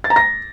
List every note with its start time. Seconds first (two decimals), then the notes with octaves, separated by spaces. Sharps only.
0.04 A6
0.10 A#5
0.16 A#6